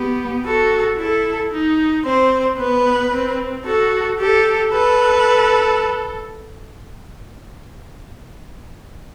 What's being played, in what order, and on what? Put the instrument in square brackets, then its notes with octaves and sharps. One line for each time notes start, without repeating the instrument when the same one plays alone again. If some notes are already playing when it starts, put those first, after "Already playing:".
Already playing: [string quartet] B3 [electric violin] G4
[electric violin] F#4 [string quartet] A4
[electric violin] E4 [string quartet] A4
[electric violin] D#4
[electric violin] C4 [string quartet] C5
[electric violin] B3 [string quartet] B4
[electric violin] C4
[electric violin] F#4 [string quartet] A4
[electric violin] G4 [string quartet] A4
[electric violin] A4 [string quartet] B4